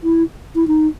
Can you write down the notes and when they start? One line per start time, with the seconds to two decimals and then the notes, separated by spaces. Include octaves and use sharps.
0.03 E4
0.56 E4
0.68 D#4